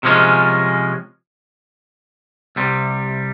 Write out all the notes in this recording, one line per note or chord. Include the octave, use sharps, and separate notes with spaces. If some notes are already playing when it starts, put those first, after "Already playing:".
C3 F3 G#3 C#4
C2 C3 G3